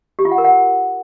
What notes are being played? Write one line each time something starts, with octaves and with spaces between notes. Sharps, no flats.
G4
F4
F#5
A#4
F#5